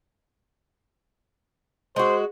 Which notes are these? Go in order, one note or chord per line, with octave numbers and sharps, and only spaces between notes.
G#3 F#4 C5